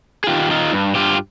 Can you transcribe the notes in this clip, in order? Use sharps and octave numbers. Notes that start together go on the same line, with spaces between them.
G#4
D#3 F4 G4
D#3 D#4 F4
G2
G2 F4 G4